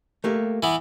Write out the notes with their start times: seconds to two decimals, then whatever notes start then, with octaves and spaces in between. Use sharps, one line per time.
0.24 A3 A#3 G4
0.63 E3 B3